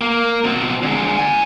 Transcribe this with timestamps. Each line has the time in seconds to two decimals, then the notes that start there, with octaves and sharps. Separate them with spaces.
0.01 A#3
0.45 B2 C4
0.83 D3 G#3
1.18 D5 G#5